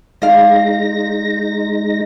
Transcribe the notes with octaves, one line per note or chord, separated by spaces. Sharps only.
G#3 D#4 D5 F5 A#6